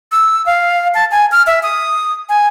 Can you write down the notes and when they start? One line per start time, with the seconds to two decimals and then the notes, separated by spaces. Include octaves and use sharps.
0.12 E6
0.46 F5
0.94 A5
1.11 G#5
1.32 F6
1.47 E5
1.63 D#6
2.29 G#5